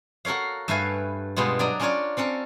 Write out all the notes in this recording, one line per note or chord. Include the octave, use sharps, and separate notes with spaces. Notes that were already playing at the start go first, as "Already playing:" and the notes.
F#4 A4 A#4 C#5 F5
G2 A3 A4 B4 F5 G#5
G2 B2 G#3 B3 F4
F#3 D4 D5 D#5 A#5
C#4 D4 F4 A#4 C#5 D5
C4 C#4 A4 A#4